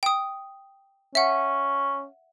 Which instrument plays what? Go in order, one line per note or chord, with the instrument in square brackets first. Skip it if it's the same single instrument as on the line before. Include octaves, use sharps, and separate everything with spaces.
[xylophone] G5 D#6
[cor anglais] C#4 [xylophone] E5 F#5